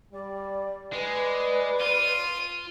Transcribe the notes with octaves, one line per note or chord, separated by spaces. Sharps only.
G3 D5
G#3 B4 D5
F4 D#7